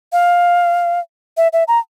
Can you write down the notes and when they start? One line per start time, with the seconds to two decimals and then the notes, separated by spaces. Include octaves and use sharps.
0.12 F5
1.37 E5
1.53 E5
1.68 A#5